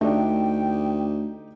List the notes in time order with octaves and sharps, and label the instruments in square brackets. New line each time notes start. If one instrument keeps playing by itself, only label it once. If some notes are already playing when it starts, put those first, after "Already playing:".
[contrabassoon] D2 [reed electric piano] A3 D4 [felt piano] D#4 G4 [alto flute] G5